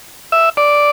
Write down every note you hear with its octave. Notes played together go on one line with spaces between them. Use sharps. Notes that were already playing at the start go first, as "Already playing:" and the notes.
E5
D5